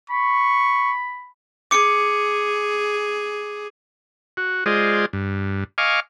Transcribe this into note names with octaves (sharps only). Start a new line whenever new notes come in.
B5 C#6
G#4 D6 C#7
F#4
G#3 F4 G#4 C5 D5 D#5
G2
D#5 F5 G#5 C#6 D6 F6